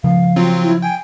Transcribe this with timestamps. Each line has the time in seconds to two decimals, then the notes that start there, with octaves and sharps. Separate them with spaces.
0.04 C#3 F3 F5
0.36 F#3 C4 F4
0.63 E4
0.82 G5 G#5